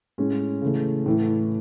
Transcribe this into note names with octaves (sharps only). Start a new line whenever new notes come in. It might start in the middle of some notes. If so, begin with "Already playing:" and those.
A2 G#3 C#4 G#4
C#3 E3 A3
A2 E3 A3